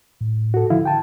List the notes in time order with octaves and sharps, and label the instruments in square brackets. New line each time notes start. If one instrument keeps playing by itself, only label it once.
[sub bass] A2
[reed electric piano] F#4 A4
[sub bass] D3 [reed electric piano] F3 E4 F5
[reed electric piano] G5 A5